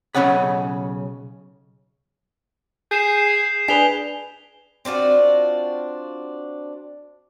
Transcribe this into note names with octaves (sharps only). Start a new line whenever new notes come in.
B1 E2 C#3 C#4 F#5 B5
G#4 G6 C7 E7
D4 G#4 B4 G#5 B6 F7 G7
C4 D4 F4 F#4